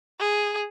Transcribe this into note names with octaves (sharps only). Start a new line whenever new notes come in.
G#4